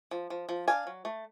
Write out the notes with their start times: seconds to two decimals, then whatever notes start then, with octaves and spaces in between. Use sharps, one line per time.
0.11 F3
0.30 F3
0.49 F3
0.68 D4 F5 G#5
0.87 F#3
1.05 A3